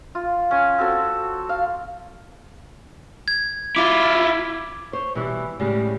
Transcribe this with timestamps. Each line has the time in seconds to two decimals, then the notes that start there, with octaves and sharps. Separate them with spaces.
0.15 F4
0.51 C#4 G#5
0.78 C4 F#4 A4
1.49 F5
3.28 G#6
3.76 E4 F4 D6
4.93 C5 C#5
5.15 B2 E3 G3
5.60 A2 C#3 G3 G#3